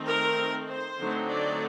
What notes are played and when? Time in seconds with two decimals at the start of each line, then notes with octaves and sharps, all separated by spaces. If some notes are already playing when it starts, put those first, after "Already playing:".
Already playing: D#3 A3 C4 D#4
0.08 A#4
0.68 C5
0.99 D3 F#3 A3 C4 D#4
1.29 D5